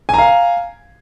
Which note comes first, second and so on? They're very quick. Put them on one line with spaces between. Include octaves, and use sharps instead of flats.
G#5 A#5 F5